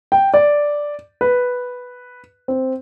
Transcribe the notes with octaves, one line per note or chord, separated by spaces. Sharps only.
G5
D5
B4
C4